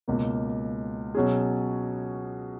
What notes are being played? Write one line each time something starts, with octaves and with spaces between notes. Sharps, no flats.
C#2 B2 A#3
B2 F#3 C#4 G#4